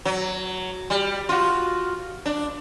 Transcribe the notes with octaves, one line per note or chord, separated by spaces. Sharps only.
F#3
G3
F4 F#4
D4